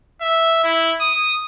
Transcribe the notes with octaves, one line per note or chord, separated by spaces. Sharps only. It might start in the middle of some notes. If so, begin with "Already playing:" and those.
E5
E4
D#6